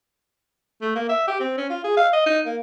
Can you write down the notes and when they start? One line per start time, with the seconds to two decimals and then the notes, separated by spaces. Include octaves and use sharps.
0.82 A3
0.96 A#3
1.09 E5
1.28 G4
1.40 C4
1.58 C#4
1.70 F4
1.84 G#4
1.97 F5
2.13 D#5
2.26 D#4
2.46 A#3